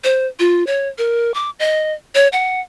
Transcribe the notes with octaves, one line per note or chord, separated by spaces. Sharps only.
C5
F4
C#5
A#4
D6
D#5
C#5
F#5